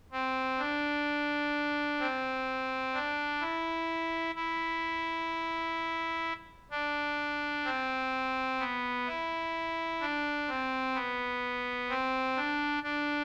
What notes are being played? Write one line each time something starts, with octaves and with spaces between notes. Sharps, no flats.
C4
D4
C4
D4
E4
E4
D4
C4
B3
E4
D4
C4
B3
C4
D4
D4